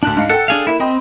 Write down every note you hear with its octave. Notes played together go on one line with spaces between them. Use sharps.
D2 D4 F#6 F#7
G#2 F5 C#7
A4 F#5 G5
D4 G#4 F5
A#3 E4 E5
C4 D#5 G5 B5